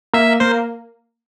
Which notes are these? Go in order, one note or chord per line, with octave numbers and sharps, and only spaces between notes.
A#3 E5
A#3 C5